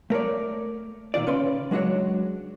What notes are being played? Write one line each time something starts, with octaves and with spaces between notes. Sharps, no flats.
A3 A#4 C#5 D5
A#2 D#3 F4 D5
C#3 C#4 B4 C6
F#3 G#3 D4 F#4 C#5